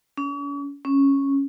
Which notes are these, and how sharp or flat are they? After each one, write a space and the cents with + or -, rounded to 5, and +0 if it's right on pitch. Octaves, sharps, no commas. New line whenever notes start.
C#4 +40
C#4 -5